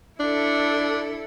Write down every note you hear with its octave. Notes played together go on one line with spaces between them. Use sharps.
D4 E4 A4